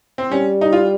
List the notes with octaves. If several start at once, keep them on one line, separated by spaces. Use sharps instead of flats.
C4
G3 C#4
D#4
F4